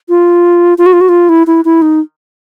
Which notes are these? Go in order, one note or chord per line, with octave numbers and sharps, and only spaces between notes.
F4
F4
F#4
F4
F#4
F4
E4
E4
E4
D#4